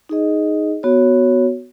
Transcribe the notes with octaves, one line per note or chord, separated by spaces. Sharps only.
D#4 G#4 D#5
B3 F#4 C#5